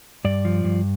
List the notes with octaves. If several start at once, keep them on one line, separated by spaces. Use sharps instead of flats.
G2 D5
F3
G2